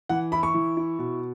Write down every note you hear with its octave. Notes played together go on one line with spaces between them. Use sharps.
E3 F#5
E4 B5
C#6
E3
E4
B2